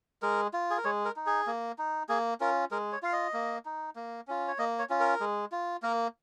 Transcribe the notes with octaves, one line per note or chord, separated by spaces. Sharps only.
G#3 A#4
F4
G#4
A#4
G#3 C#5
A#4
D#4
G#4
A#3
D#4
A#3 G#4
C#4 F4 A#4
G#3 A#4
C#5
F4 F5
D#5
A#3
D#4
A#3
C#4 F4
C#5
A#3 D#5
C#5
C#4 F4
A#4
G#3
F4
A#3 A#4